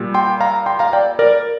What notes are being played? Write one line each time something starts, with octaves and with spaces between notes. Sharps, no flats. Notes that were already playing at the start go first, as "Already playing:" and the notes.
Already playing: A#2 G3
G5 C6
F5 A#5
G5 C6
F5 A#5
D5 G5
A#4 D5